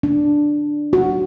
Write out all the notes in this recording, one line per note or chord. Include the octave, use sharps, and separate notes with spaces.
D4
F#4